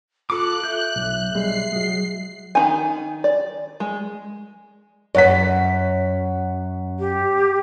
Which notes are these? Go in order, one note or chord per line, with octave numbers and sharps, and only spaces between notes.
F4 A4 D6 F#6
E5 G6
B1
B1 G3 G#3 C7
F#3 G#3
D#3 D#4 G#5
D5
G#3
F#2 C#5 F#5 B6
G4